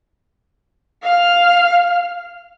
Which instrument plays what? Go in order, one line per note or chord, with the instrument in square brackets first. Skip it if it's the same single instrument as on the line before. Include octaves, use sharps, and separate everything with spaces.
[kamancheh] F5 F6